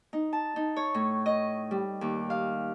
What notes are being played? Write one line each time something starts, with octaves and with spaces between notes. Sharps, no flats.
D#4
A5
D#4
C#5
A2
D#5
G3
D#2
F5